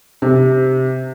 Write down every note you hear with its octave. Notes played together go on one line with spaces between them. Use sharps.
C3